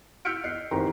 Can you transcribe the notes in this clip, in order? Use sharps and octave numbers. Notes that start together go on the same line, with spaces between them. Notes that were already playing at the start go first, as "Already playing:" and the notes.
E6 F6 G6 B6 C#7 D7
D#5 F#6 C7
G#1 D#2 E3 G4 C5 A#5